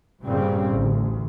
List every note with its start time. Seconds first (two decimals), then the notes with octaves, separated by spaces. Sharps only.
0.24 G2 A#2 C#3 G3 C4
0.70 A1 D2